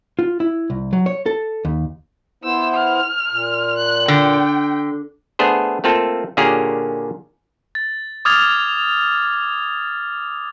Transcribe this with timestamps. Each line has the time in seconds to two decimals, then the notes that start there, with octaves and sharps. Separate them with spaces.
0.19 F4
0.40 E4
0.70 C2
0.93 F#3
1.06 C#5
1.26 A4
1.65 D#2
2.44 B3 E4 C5 E6
2.74 F6
3.32 A#2
3.78 F#6
4.08 D3 G5
5.39 A3 B3 D4 G#4 C5
5.84 A3 A#3 C4 F4 A4
6.37 A#2 D3 A#3 C#4 G4 G#4
7.75 A6
8.25 D6 D#6 F6 G#6 A6 F7